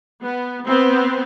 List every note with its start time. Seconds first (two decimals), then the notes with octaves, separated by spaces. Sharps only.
0.23 B3
0.67 B3 C4